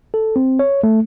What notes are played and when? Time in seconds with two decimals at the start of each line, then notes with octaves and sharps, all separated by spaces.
0.14 A4
0.36 C4
0.59 C#5
0.83 A3